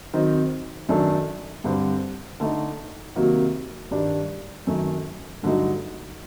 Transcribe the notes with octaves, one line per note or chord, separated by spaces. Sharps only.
D#3 F#3 C4 D#4
F#2 D#3 A3 D4 A4
G2 D3 G3 C4
D3 A3 D#4
C3 D#3 F#3 A#3 F#4
G2 D#3 G3 D4
F#2 D#3 A3
G2 D3 F#3 A3 D#4